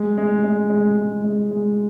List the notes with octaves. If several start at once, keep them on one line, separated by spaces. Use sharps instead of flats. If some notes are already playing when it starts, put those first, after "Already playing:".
Already playing: G#3
G#3
G#3
G#3
G#3
G#3
G#3